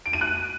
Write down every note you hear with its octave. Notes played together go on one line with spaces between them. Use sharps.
D7
D#7
F#6